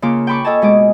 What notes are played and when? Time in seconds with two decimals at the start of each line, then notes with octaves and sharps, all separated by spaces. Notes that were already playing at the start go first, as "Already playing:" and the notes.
0.02 C#3 A#3 F4 D6
0.27 G5 A5 B5 C#6 D6
0.45 A4 D#5 G#5 A5
0.62 B2 G#3 D#5 D6